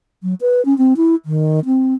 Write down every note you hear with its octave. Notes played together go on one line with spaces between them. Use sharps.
F#3
B4
C#4
C4
E4
D#3
C4